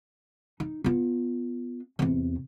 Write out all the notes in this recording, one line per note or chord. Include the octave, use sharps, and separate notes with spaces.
D#4
B3 F4
E2 C3